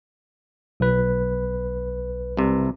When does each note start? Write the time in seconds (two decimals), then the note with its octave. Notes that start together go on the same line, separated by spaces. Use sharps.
0.80 B1 B4
2.37 C2 C3